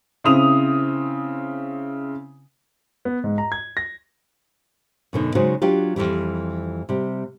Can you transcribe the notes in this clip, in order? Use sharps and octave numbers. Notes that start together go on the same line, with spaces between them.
C#3 C4 E4 D#6 F7
B3
G#2
A#5
G#6
A#6
F#2 B2 D3 D#4
C#3 F#3 G#3 D#4 F#4 C5
F#3 D4 F4 G4
F2 G#2 E3 G3
C3 G3